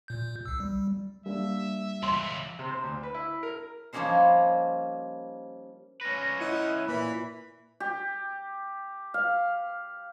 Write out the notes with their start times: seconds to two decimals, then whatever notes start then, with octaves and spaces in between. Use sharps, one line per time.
0.08 A#2 G6
0.45 C2 E6
0.60 G3
1.26 G3 A#3 D4 E5
2.03 C#2 E3 C6
2.59 C3
2.71 C5
2.84 D2
3.03 B4
3.14 E4
3.43 A#4
3.93 F3 G3 A#3 C#4 D#4 C5
6.01 C#4 B4 A#6
6.40 D#4 E4 F#5 F#6
6.88 A#2 E3 B5
7.80 G4
9.14 F5